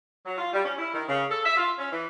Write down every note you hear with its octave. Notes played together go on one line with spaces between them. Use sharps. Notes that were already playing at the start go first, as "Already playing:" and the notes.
F#3
F4
G3
C#4
E4
D#3
C#3
A4
E5
F4
C#4
E3